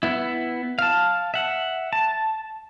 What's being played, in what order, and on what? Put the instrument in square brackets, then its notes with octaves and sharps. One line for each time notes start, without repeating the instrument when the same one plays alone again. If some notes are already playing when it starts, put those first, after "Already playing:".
[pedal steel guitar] B3 E4
F5 A5
E5 F#5
A5